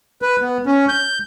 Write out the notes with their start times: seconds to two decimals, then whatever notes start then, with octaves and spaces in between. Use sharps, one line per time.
0.22 B4
0.41 B3
0.66 C#4
0.89 G6